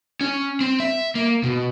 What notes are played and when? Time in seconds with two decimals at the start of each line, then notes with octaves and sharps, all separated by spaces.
0.21 C#4
0.61 C4
0.80 E5
1.15 A#3
1.44 B2